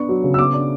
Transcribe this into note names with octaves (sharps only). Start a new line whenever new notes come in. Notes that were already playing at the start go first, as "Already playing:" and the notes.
Already playing: B3 D4 C#6
F#3
C#3
E6
B3 D6
D4